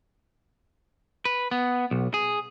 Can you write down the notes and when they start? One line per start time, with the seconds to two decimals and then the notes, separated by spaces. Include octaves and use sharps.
1.25 B4
1.51 B3
1.91 B1
2.14 G#4